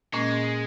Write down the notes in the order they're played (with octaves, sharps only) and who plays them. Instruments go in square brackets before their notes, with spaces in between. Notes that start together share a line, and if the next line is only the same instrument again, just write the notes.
[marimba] A#2 A#3 C#4 [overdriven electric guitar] G#3